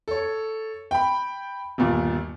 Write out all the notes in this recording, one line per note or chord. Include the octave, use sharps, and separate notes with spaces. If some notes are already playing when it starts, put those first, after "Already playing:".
A4 C#5
G5 B5
G1 D#2 A#2